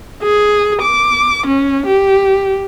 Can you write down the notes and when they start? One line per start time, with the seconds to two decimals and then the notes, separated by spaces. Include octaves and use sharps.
0.22 G#4
0.81 D6
1.46 C#4
1.86 G4